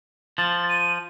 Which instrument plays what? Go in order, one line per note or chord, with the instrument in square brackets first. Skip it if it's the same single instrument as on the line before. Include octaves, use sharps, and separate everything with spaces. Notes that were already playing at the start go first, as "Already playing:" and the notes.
[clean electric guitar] F3 [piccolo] A6
[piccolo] D#7